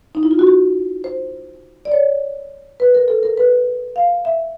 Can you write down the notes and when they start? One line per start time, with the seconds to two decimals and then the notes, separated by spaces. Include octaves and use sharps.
0.15 D#4
0.23 E4
0.31 F4
0.39 F#4
0.47 G4
1.04 C5
1.85 D5
1.92 C#5
2.80 B4
2.95 A#4
3.08 A4
3.23 A#4
3.37 B4
3.96 F5
4.25 E5